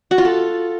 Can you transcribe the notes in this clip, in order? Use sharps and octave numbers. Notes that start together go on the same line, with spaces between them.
F#4
F4
A4